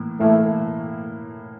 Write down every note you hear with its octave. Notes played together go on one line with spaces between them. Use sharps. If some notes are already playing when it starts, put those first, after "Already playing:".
Already playing: A2 E3 A#3 E4
A2 E3 A3 A#3 E4